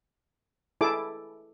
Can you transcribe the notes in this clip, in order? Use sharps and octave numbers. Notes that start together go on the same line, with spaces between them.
E4 G#4 A4 D6